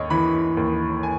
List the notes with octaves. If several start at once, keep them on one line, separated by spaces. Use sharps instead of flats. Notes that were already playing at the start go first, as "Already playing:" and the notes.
Already playing: D#2 C#5 D#5
E3 B5
D#2
G#5